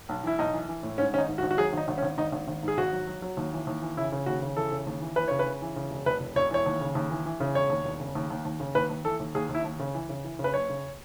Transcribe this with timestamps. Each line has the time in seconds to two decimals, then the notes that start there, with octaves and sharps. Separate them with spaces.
0.09 B1
0.24 E3 E4
0.39 B1 D#4
0.54 E3
0.68 E3
0.83 A2
0.98 G#2 C#4
1.13 G#1 C#4
1.18 D#4
1.28 G#2
1.38 F#4
1.43 G#1
1.51 F#4
1.58 F#3 G#4
1.73 G#1 D#4
1.88 G#1
1.98 C#4
2.03 G#1
2.18 G#1 D#4
2.32 G#1
2.48 G#1
2.63 G#2 G#4
2.78 G#1 F#4
2.93 F#3
3.07 F#3
3.22 F#3
3.37 D#2
3.53 E3
3.67 D#2
3.82 E3
3.97 C#3 E4
4.12 C#3
4.26 D#2 F#4
4.42 C#3
4.56 E3 A4
4.72 C#3
4.87 D#2
5.02 E3
5.16 E3 B4
5.28 C#3 C#5
5.39 B4
5.46 C#3
5.62 E3
5.76 C#3
5.91 E1
6.06 E1 B4
6.21 E1
6.36 E1 C#5
6.51 E3 C#5
6.66 D#2
6.81 C#3
6.95 D#2
7.11 E3
7.26 E3
7.40 C#3
7.55 E1 C#5
7.70 D#2
7.85 E1
8.00 C#3
8.15 D#2
8.30 D#2
8.45 D#2
8.60 C#3
8.75 D#2 B4
8.90 D#2
9.05 E3 A4
9.20 D#2
9.35 D#2 G#4
9.49 D#2
9.55 E4
9.64 D#2
9.80 C#3
9.95 E3
10.09 C#3
10.24 E3
10.39 C#3
10.44 B4
10.54 F#1 C#5
10.69 C#3